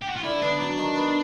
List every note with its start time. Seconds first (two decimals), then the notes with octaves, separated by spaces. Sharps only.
0.02 G4
0.09 F#4
0.16 F4
0.23 D3 E4
0.42 B3 D4
0.60 F#3 D4
0.78 D#3
0.96 B3